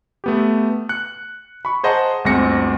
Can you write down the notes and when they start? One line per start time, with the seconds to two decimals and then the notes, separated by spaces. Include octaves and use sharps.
0.24 A3 B3 G4
0.89 F#6 C#7
1.65 B5 C#6
1.84 G#4 C5 D#5 F#5 A5 A#5
2.25 G1 D2 G#3 C4 A#6 C#7